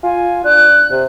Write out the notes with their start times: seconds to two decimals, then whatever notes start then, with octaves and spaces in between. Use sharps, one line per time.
0.03 F4 G#5
0.44 D4 F#6
0.91 C3